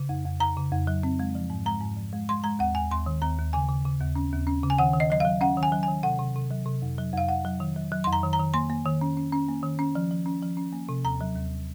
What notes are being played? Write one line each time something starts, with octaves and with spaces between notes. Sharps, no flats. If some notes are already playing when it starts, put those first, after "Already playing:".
Already playing: C#3
F2
F2
F2 A#5
C#3
F2
F#3
C4
G#3
F3
G#2
G#3 A#5
G#2
F3
G#3
G#3 C6
G#3 A#5
D#2 F#5
D#2 G#5
D#2 C6
D#3
D#2 A#5
D#2
C#3 G#5
C#3
C#3
D#2
C#4
D#2
C#4
C#3
G#5
D#3 F#5
D#3
D#5
F#3 D#5
F#3 F5
C#4 F#5
D#3
G#5
F#3
D#3 G#5
C3 F#5
C3
C3
F#3
C3
F2
F#3
F2 F5
F2 F#5
F#3
D#3
F#3
F#3
F2 C6
A#5
D#3
A#5
D#3
A#3 C6
A#3
D#3
C#4
C#4
C#4
A#3
D#3
C#4
F3
F3
C#4
F3
C#4
A#3
C3
D#2 A#5
F#3
D#2